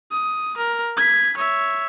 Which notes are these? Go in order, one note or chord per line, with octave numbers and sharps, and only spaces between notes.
D#6
A#4
G#6 B6
C#5 E5